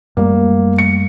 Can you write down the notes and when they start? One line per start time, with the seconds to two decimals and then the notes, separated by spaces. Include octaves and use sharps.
0.17 F#2 G3 A3 A#3
0.78 C#7